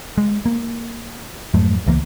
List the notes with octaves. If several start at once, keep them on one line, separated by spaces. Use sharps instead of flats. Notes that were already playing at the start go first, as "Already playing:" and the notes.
G#3
A#3
F2 G#2 F#3 A3
C#2 E3 A3 A#3